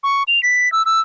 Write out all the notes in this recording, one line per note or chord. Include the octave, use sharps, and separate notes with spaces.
C#6
F7
B6
E6
E6